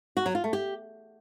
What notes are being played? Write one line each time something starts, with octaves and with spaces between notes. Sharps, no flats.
F#4
F#3
F4
A3
G4